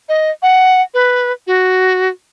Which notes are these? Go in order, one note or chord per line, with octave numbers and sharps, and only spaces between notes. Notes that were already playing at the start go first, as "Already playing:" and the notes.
D#5
F#5
B4
F#4